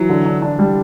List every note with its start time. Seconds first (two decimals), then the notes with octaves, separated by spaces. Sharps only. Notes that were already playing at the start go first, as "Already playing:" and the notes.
Already playing: E3 F#3
0.09 D3
0.26 D4
0.42 D4
0.59 G3